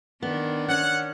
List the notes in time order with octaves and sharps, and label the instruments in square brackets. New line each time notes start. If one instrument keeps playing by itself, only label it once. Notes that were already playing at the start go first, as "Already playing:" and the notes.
[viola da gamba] D#3 D4 [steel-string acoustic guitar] B3
[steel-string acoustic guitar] C#4 [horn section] F#5